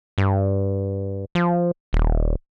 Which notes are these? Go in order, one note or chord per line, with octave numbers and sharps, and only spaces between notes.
G2
F3
D#1